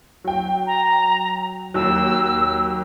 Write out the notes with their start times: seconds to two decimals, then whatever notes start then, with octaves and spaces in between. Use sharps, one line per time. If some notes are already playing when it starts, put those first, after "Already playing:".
0.24 F#3 G5
0.66 A#5
1.74 D#2 F#3 E6